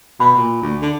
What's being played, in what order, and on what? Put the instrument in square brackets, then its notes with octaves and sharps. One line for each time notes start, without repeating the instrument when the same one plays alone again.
[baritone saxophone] B2 [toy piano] B5
[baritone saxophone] A#2
D2
D3